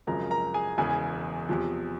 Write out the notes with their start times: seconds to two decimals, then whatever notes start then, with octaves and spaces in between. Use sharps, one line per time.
0.07 G#1 F#2 C#3 F3 A#4 A#5
0.31 A#4 A#5
0.54 G#4 G#5
0.78 E1 E2 C#3 E3 G#4 G#5
1.49 E2 C3 F3